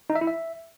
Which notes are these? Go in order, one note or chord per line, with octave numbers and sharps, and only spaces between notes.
D#4
E5
E4
E5